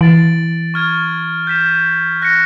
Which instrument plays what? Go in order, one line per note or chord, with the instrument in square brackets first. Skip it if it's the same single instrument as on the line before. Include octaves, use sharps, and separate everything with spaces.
[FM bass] E3 [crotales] A6 D7 F#7
[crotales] C#6 F6 G#6
G6 B6 E7
F#6 A#6 C#7